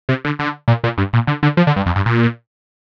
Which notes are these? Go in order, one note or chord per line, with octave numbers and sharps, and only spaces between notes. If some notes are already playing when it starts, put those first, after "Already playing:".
C3
D3
D3
A#2
A#2
G2
A#2
D3
D3
F3
D3
G2
F2
G2
A#2